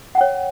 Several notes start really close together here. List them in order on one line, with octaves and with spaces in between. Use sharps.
F#5 G5 C#5